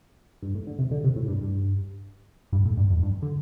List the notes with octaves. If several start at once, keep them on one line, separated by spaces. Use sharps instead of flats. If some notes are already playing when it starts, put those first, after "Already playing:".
G2
A2
D3
C3
D3
C3
A2
G2
G2
G2
A2
G2
F2
G2
D3